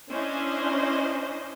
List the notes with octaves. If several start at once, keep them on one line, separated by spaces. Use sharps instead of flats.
C#4 D4 E4 C5 D#5